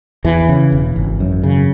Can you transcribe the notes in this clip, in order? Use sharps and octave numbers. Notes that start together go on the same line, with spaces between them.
E2 E3
C#3
E1
G#1
F#2
C#3